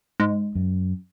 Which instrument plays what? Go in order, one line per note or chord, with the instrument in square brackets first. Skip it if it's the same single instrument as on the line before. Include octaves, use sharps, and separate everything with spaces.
[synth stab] G#2
[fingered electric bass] F#2